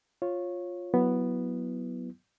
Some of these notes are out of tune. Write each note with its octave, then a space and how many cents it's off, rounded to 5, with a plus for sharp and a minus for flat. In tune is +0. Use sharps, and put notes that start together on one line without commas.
F4 +5 C#5 -15
F#3 +0 B3 +0 E4 +0